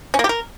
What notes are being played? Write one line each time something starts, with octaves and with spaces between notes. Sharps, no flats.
C#4
A#3
G4
A#4